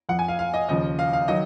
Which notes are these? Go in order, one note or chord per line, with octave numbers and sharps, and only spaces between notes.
F2 F3 F#5
G#5
F5
F5
D#5
D#2 C#3 F3 D#5
F5
F5
D#3 F#3 D#5